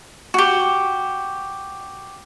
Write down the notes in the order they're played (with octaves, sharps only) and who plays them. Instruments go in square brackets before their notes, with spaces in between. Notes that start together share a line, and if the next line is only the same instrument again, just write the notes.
[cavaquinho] F#4 G4